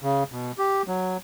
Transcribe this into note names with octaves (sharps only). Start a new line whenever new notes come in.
C#3
B2
G4
F#3